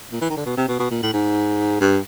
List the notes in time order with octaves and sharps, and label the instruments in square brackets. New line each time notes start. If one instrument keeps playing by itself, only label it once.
[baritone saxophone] A#2
E3
D#3
D3
B2
C3
B2
B2
A#2
A2
G#2
G2